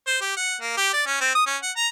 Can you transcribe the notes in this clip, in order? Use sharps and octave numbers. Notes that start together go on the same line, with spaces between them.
C5
G4
F#5
A#3
G4
D5
C#4
C4
D#6
C#4
F#5
A#5